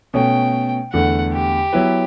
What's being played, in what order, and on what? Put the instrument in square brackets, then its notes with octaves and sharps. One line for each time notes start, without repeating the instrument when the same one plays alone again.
[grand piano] B2 A3 C#4 [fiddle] G5
[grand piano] E2 D3 A3 [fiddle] F#5
[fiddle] G4
[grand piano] F#3 B3 E4 B4